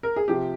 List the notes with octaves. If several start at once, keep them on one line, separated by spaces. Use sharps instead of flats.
A#4
G#4
C3 F3 G4